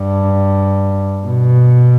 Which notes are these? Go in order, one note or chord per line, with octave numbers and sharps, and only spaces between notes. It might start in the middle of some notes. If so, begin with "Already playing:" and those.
Already playing: G2
B2